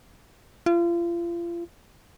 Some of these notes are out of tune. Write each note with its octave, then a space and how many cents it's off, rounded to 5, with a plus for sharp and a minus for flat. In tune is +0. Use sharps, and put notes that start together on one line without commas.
F4 -35